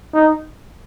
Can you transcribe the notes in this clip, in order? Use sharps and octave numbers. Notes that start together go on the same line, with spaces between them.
D#4